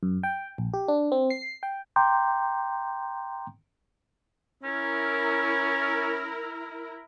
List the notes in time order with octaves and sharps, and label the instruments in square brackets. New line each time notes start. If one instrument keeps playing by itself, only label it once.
[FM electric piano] F#2
G5
A#1
G4
D4
C4
C7
G5
[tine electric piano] G5 A#5 C6 D6 G6
[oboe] C#4 [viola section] E4 A#4